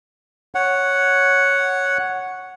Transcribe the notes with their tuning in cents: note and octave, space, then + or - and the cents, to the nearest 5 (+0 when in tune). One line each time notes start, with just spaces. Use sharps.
C#5 +0 F#5 +0